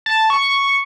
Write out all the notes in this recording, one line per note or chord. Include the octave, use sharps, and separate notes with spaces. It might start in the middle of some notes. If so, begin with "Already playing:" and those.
A5
C#6